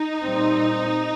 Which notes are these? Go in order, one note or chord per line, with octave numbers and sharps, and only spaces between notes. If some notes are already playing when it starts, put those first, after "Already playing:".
Already playing: D#4
A#2 G3 C4